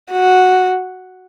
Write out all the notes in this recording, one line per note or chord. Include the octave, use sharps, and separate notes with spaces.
F#4